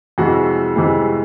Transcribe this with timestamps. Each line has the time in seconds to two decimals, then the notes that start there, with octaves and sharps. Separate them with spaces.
0.18 F2 C3 E3 G#3 F#4
0.76 F2 C3 E3 G#3